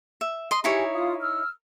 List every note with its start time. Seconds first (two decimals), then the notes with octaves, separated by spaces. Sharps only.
0.21 E5
0.51 D#5 C6
0.64 D#4 E4 G4 G#4 C#5 G#5
0.94 F4 F5 D#6
1.21 E6 F6